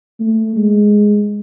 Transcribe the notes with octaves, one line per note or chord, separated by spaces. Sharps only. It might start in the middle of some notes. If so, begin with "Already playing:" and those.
A3
G#3